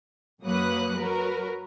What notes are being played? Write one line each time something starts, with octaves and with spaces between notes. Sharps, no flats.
F#2 F#3 A#3 B4 D#6 F#6
F#3 F#4 A#4 B4